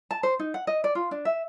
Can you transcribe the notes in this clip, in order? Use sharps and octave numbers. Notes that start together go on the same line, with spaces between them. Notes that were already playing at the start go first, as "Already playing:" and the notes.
A5
C5
D#4
F#5
D#5
D5
F4
D4
E5